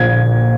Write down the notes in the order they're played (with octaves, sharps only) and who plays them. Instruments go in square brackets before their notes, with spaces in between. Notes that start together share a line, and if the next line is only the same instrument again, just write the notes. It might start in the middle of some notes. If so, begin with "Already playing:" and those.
Already playing: [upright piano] A#1 A#2 G#6